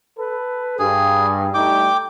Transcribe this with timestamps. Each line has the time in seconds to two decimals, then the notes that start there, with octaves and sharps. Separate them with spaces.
0.18 A4 B4
0.79 G2 G#4
1.54 G3 A3 D#4 G5 D6